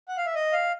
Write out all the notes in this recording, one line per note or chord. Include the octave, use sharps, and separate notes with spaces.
F#5
F5
E5
D#5
F5